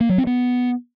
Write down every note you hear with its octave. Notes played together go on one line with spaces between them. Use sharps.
A#3
F#3
C4
B3